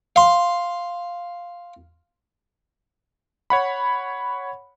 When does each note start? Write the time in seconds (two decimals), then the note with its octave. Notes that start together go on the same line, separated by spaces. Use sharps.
0.16 F5 C6
3.50 C#5 F#5 B5